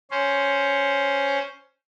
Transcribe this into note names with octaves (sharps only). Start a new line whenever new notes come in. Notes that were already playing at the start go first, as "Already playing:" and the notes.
C#4 C5